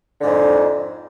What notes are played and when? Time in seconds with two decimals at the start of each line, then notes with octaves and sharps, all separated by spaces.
0.20 D3
0.23 G#2
0.26 F2